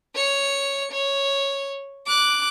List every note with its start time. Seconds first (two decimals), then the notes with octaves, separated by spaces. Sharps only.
0.15 C#5 C#7
0.92 C#5
2.06 D6 F#6